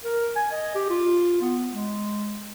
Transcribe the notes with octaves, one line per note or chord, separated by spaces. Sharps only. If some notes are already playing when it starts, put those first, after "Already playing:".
A#4
G#5
D#5
G4
F4
B3
G#3